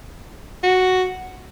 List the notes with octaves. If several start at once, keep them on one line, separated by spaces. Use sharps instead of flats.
F#4